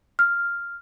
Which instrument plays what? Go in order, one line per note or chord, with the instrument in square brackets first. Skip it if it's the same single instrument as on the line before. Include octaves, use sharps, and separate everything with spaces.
[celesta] F6